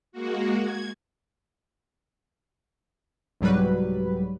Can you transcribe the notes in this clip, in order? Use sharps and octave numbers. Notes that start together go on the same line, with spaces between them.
G#3 A#3 F#4
G#6
C2 G#2 F#3 G3 B4